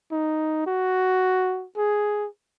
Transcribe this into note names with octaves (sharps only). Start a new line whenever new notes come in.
D#4
F#4
G#4